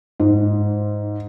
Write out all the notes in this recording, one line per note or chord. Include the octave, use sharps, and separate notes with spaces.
G#2